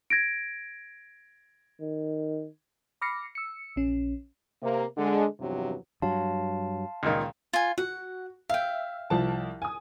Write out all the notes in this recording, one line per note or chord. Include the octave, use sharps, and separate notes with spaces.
G#6 A#6 D7
D#3
B5 D6 F6 A#6 C7 C#7
E6 C#7
A#1 C#4
C3 A#3
D3 G#3
E2 G2 C3 F3 F#3
G2 F#3 F5 A5 C6
C#2 A#2 D#3
F4 G#5
F#4 F#5
E5 F5 G5
C2 F3 A5
G#5 D#6